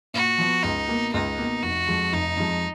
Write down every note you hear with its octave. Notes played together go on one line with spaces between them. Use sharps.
A#2 F#4
F3 B3
C#2 D#4
B2 A#3
C#2 D#4
B2 A#3
F1 F#4
F2 F3 G#3
F1 D#4
F2 F3 G#3